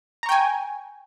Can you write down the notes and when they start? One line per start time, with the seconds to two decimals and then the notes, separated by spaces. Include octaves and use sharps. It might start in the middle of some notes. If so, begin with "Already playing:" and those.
0.23 A#5
0.26 C#6
0.29 G5
0.32 G#5